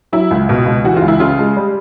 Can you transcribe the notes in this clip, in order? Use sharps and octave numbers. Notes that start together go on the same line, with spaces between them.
F#3 E4
C#2
B2
C#2
E3 F#4
F4
C#2
E4
C#3 F4
G#3
G3